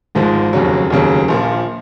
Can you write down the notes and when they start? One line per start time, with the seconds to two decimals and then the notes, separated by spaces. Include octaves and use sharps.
0.15 G#1 G#2 F3 G#3
0.53 F1 D#2 C#3 F#3
0.90 F1 D#2 C#3 F#3
1.28 A#1 A#2 F3